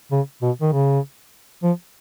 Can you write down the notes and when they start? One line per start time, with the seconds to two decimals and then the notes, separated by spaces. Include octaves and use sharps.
0.12 C#3
0.42 B2
0.61 D#3
0.73 C#3
1.63 F3